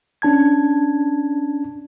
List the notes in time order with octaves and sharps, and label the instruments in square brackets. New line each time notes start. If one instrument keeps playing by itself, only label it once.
[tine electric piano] C#4 D4 A5 G#6